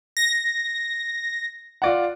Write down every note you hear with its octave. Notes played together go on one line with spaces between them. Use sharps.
A#6
F4 D5 F#5